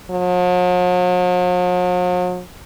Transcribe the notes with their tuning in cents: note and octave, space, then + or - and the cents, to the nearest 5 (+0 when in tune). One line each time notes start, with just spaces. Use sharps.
F#3 -45